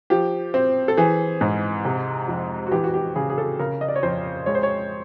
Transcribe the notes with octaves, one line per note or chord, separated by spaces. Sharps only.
F3 G4
C4
A4
E3 G#4
G#2
C3
F2
F#4
E3 G4
F#4
G4
C#3 G#4
G#4
A4
C#3 A#4
D#5
D5
C#5
F2 C5
G#3 C#5
C5
C#5